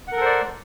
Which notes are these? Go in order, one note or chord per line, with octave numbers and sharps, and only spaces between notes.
A4 A#4 C5 D5 F#5